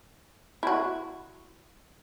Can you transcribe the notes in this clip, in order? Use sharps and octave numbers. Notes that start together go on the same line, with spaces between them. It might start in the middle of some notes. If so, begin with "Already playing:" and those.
E4 F#4